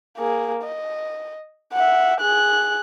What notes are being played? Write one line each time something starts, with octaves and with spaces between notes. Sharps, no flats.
A#3 G#4
D#5
E5 F#5
G#4 F#6